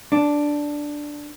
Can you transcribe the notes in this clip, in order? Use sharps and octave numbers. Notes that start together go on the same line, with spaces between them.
D4